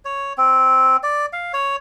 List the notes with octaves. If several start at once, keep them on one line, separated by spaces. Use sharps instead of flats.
C#5
C4
D5
F5
C#5